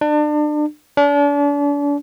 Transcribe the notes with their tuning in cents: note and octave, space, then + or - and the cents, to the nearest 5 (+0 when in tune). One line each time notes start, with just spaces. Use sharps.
D4 +30
D4 -40